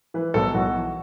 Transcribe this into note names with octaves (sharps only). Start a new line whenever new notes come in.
E3 B4
B1 A4
B1 F#4
E3